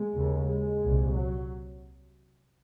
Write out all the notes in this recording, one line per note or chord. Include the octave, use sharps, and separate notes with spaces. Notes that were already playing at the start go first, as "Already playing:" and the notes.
Already playing: G#3
D#2 C#3
G#3
C2 A#2
F#3